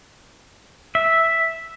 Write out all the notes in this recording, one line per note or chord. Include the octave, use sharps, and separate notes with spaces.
E5